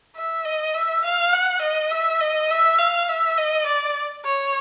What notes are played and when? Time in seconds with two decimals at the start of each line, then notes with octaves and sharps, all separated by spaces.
0.17 E5
0.45 D#5
0.74 E5
1.05 F5
1.33 F#5
1.62 D#5
1.91 E5
2.21 D#5
2.50 E5
2.79 F5
3.09 E5
3.38 D#5
3.67 D5
4.25 C#5